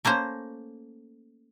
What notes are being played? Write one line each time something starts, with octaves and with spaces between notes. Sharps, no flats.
A3 A#3 C#4 C5